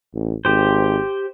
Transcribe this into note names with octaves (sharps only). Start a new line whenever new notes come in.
A1
G#1 G4 C5